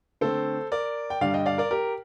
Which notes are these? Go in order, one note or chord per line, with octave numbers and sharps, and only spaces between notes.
D3 A3 C4 A4 C5
A#4 D5
G5
G2 D3 G3 D5 F5
D#5 G5
D5 F5
A#4 D5
G4 A#4